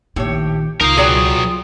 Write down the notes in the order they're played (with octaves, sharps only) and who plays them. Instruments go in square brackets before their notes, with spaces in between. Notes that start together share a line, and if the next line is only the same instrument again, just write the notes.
[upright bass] A#1 D#3 [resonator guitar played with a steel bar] A2 C#5 [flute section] G4
[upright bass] C#2 [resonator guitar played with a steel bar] D#4 [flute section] F4 D#6 [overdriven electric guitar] A#4 F5
[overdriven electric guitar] B1 F#3 [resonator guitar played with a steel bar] G#4 D5 G5